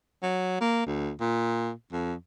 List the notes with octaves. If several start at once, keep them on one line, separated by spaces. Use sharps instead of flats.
F#3
A#3
D2
A#2
F2